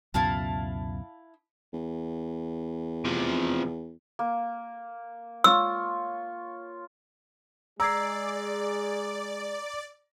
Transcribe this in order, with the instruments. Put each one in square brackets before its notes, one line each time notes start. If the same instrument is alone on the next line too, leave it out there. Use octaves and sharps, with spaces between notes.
[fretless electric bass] C#2 F#2 B2 [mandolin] E4 F5 A5
[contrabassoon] E2
[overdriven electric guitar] C3 F3
[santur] A#3
[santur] F4 C#5 [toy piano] E6
[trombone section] G#3 G#4 [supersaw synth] D5 [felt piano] A#5 [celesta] E6 G#6 C7